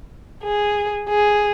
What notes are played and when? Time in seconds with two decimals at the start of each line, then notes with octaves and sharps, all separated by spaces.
0.43 G#4
1.09 G#4